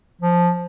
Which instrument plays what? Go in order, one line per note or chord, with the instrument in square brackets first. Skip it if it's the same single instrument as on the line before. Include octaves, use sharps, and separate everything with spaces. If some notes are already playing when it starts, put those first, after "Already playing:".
[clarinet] F3